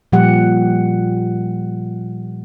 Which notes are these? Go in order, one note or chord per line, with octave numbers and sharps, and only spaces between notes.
A#2 F3 G3 G4 F#5